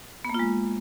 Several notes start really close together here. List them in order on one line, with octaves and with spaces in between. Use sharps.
B3 A#3 F4 G#3